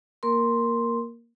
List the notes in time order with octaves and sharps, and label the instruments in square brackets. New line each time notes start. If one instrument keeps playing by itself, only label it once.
[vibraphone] A#3 A#4 C6